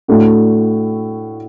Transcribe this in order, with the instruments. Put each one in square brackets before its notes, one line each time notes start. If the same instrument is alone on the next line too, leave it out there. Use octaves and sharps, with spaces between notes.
[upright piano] A2 A3 D4 F#4